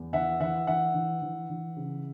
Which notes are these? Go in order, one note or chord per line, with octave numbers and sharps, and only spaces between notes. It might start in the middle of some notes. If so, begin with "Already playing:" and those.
Already playing: E2
E3 E5 F#5
E3 E5 F#5
E3 E5 F#5
E3
E3
E3
C#3